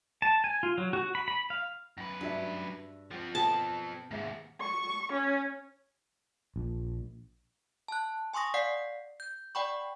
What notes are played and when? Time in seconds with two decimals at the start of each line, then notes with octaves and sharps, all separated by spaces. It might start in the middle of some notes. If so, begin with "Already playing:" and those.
0.22 A5
0.44 G#5
0.63 F4
0.78 F#3
0.93 F#4
1.15 B5
1.28 B5
1.50 F5
1.97 F#2 B4
2.21 G2 D4 F#4 E5
3.11 F3 C4 F#5
3.35 B2 A4 G5 A5
4.11 D#2 G#2 G#3 E5
4.60 C#6
5.13 C#4
6.56 A#1
7.88 A5 F#6
8.34 G#5 C6 C#6 D#6 A#6
8.54 D5 F5 F#5 B6 C7
9.20 G6
9.55 D5 F#5 G5 B5 C#6